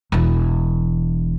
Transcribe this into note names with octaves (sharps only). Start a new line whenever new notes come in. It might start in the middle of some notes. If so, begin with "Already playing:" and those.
E1 E3